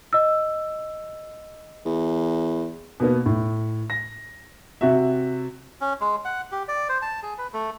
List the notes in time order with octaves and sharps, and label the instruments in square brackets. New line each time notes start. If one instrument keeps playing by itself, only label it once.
[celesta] D#5 E6
[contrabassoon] E2
[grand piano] B2 A#3 B3
A2
A#6
C3 F#4 E5
[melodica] C#4
G#3
F#5
G4
D5
C5
A5
G#4
B4
A3